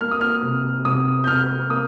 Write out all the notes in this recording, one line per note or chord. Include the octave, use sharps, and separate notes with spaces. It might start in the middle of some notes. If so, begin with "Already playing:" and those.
A#3 F6
D#6
F6
C3
C3 D#6
G6
C3 F6
A#3 D#6